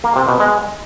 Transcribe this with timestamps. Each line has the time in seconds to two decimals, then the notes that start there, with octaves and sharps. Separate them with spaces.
0.04 A#3
0.16 C3
0.28 B2
0.40 G#3